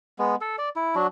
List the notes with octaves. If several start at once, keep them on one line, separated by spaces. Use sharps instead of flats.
G#3 B3
A4
D5
E4
F#3 D4 F#4